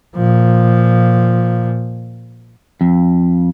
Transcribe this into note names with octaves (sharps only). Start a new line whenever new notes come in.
A#2 F3
F2